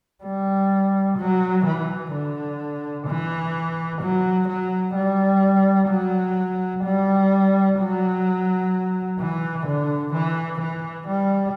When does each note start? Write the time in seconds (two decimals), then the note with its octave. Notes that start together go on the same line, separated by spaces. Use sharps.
0.24 G3
1.17 F#3
1.66 E3
2.13 D3
3.07 E3
4.01 F#3
4.48 F#3
4.95 G3
5.89 F#3
6.84 G3
7.79 F#3
9.19 E3
9.66 D3
10.14 E3
10.60 E3
11.08 G3